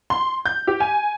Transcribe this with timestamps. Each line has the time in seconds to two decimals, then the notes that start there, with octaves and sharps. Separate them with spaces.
0.10 C6
0.46 G6
0.67 G4
0.80 G#5